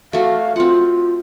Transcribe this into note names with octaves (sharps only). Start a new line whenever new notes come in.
A3 F#4 F5
C4 F4 F#5